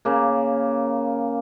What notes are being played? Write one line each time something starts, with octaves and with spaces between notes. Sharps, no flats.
C#3 A#3